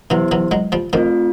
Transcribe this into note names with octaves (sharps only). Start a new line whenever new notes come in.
E3 F#3 B3 E4 G4 C5
E3 F#3
F#3 G#3
F3 G3
D#3 F3 A3 C4 F4